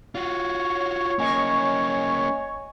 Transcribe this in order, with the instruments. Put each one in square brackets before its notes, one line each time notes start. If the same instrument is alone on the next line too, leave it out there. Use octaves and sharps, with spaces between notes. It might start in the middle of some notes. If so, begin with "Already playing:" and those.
[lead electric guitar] F4 F#4 [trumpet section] C#5
[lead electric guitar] A#3 C#4 [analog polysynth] D#5 G#5 C#6